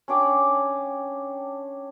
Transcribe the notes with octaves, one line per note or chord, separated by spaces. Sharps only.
C#4 D4 G5 D6